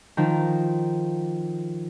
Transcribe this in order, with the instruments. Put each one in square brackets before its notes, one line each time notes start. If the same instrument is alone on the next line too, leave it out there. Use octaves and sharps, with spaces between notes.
[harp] D#3 F3